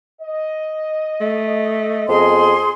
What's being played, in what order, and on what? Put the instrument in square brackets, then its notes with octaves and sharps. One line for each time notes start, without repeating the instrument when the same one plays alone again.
[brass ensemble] D#5
[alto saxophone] A3
[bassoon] F2 [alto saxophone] B3 [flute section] G#4 C6